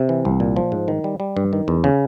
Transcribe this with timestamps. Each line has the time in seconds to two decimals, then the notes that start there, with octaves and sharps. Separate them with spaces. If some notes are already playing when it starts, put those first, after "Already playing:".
Already playing: C3
0.09 E3
0.25 C2
0.40 A#2
0.56 F3
0.72 G#2
0.88 D#3
1.04 G3
1.20 G3
1.37 G2
1.53 D#3
1.68 E2
1.84 C#3